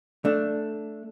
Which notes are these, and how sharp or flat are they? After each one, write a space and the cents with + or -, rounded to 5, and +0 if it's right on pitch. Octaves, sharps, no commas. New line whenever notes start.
A3 +0 D4 +0